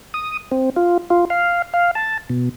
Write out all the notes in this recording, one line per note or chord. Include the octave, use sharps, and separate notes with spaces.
D#6
C4
F4
F4
F5
F5
A5
B2